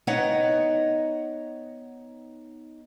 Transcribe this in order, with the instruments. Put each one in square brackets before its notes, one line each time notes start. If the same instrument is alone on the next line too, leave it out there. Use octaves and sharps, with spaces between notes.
[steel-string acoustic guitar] B3 D#4 C#5 D#5 F#5 G5